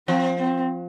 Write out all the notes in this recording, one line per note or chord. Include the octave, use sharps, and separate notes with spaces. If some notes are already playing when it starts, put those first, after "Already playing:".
F3 C4
C4